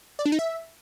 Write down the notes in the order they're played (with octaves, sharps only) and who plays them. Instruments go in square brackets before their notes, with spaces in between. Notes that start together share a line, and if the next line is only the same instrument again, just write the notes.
[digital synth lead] D5
D4
D#4
E5